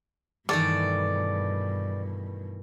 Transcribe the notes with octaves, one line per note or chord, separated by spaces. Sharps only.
G2 B2 D#3 E3 A3 D5